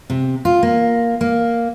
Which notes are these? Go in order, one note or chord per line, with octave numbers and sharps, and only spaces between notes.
C3
F4
A#3
A#3